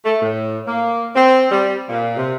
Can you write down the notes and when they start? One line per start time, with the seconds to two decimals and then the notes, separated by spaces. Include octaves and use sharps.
0.05 A3
0.22 A2
0.67 A#3
1.16 C4
1.51 G3
1.89 A#2
2.17 C3